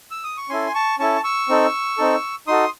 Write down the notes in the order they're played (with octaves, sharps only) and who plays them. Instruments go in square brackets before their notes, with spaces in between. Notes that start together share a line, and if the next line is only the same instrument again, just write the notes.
[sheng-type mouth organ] E6
D#6
C#6
C#4 E4 A4 G#5 C6
A5 C#6
C#4 E4 A4 A5 C#6
C#6 E6
C4 D#4 A4
C4 D#4 A4
D#4 F#4 A4 C6 D#6